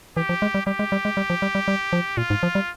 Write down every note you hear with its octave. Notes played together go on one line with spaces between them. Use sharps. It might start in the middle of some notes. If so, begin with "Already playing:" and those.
E3 G4
F3
G#3
G3
G3 G4
G#3
G3
G#3
G3
F3
G3
G3
G3
F3
A#2 F4
G#2
F3
G3